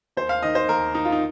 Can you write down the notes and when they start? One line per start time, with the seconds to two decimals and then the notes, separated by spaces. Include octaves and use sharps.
0.17 D#2 C5
0.29 F5
0.43 D#3 D#5
0.55 C5
0.69 D#2 A#4
0.95 D#3 D#4
1.05 F4
1.12 D#4